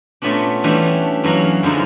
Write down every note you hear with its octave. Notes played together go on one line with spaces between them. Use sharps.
A#2 A3 B3 C#4 D4
E3 G3 A3 C#4 D4
F#2 E3 F#3 F#4 F5
F#2 D3 F3 G#3 D#4 E4